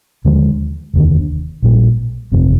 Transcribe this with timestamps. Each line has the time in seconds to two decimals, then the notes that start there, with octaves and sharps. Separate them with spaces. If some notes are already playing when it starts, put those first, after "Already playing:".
0.25 D#2 D3 F3 G#3
0.94 F1 D#2 D3
1.62 A#1 A#2 G3
2.32 G1 F2 C3